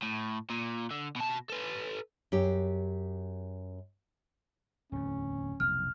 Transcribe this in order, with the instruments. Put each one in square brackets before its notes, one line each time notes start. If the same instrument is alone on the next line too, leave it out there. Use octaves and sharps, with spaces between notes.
[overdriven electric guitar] A2
A#2
D3
B2 A5
A4 B4
[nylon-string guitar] F#2 G4
[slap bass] D1 E2 [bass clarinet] C#4
[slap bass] F1 B1 [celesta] F6